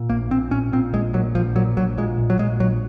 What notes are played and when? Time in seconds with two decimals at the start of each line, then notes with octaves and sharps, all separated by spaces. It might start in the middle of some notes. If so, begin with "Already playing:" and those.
Already playing: A#2
0.10 A#1 A#3
0.31 A#2 C4
0.51 A#1 C#4
0.72 A#2 C4
0.93 A#1 G#3
1.13 A#2 F#3
1.35 A#1 F3
1.56 A#2 F#3
1.76 A#1 F#3
1.98 A#2 G#3
2.18 A#1
2.30 F#3
2.39 A#2 G#3
2.60 A#1 F#3